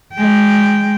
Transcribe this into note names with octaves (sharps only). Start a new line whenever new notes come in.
G#3 G5